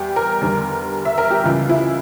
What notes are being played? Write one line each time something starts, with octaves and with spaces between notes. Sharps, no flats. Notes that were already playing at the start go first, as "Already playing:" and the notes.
Already playing: E2 G3 G4
A#4
E2 D3 G3
E5
A#4
G4
C#2 C#3 E3 G3 F4
E4